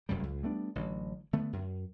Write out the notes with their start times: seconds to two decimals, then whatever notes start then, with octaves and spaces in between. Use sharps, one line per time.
0.09 E1 F#2 C#3 G3
0.23 C#2
0.43 G3 A3 B3 D4
0.75 A1 D3 F#3
1.33 D3 A3 B3
1.53 F#2